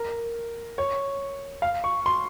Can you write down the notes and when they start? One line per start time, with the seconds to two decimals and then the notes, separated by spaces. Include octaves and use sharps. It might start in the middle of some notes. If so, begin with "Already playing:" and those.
Already playing: A#4
0.78 C#5
1.62 F5
1.84 C#6
2.06 C6